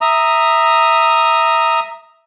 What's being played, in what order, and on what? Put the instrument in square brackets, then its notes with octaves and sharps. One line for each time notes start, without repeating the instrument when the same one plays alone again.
[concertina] E5 A#5 D#6